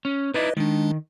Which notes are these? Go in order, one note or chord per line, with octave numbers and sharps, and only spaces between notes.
C#4
D#4 E4 B4 D5 D#5
D#3 G#3 D4